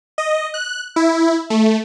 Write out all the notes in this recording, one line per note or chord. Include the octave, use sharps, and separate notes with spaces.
D#5
F#6
E4
A3